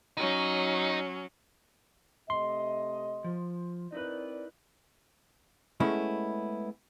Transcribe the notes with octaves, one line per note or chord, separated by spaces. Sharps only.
F#3 C#4 D#4
C3 A3 D#5 C6
F3
C4 D#4 E4 A#4 B4 D5
G#3 A3 B3 C#4 E4